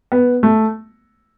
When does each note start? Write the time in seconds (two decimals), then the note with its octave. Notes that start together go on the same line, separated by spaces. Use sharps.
0.12 B3
0.43 A3